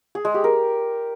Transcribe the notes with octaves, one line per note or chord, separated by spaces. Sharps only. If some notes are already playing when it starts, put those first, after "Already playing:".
G#4
G#3
G4
A#4